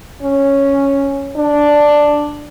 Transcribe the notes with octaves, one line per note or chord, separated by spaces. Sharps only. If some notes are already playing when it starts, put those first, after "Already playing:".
C#4
D4